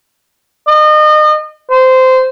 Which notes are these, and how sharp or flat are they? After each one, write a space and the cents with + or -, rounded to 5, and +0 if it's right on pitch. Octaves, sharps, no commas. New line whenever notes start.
D#5 -35
C5 -15